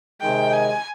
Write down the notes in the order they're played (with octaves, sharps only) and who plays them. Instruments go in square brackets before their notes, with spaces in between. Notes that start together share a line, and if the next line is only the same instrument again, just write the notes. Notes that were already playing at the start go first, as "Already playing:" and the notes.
[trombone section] C3 D#3 G#3 [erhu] G5
[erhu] G#5